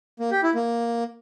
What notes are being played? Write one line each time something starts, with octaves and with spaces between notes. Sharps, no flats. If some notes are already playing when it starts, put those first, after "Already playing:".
A#3
G4
E4
A#3